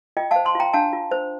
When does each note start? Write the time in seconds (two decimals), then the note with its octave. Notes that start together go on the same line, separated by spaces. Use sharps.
0.17 F4 D#5 G5
0.31 C5 F5 A5
0.45 A5 C6
0.55 F4 G5 A#5
0.74 D4 F5 A5
0.93 F4
1.11 C5